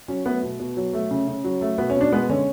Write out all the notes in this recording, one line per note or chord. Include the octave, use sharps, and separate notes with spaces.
F#3 C#4
A3 B3
B2
B2
F#3
A3
C#3
C#3
F#3
A3
B2 B3
C#4
B2
D4
G#3 B3
D3 C#4